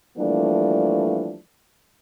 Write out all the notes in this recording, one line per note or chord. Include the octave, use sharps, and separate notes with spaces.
E3 F3 G3 A3 A#3 D4